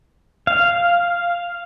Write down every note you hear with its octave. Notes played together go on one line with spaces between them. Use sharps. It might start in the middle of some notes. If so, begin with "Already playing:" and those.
F5